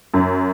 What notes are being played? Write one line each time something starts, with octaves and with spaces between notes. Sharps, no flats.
F#2